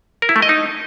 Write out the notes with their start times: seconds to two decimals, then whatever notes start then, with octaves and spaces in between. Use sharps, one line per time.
0.22 A#4
0.29 E4
0.36 A3
0.42 D#5
0.49 D#4